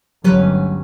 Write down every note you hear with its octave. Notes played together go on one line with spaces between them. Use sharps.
G1 D2 F#3 C#4 G4 B4